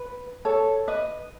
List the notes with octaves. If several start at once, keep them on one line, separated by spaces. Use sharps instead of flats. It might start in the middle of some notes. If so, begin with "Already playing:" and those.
Already playing: B4
A4 C#5
B4 D#5